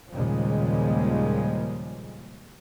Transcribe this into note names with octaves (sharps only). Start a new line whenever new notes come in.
D#2 A#2 C#3 F3 G3 G#3